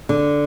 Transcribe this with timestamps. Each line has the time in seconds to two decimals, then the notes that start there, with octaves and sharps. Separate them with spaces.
0.09 D3